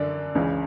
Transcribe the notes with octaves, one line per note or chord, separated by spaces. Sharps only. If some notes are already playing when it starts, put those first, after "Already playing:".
Already playing: F#2 D3 D4 D5
C#2 C#3 E3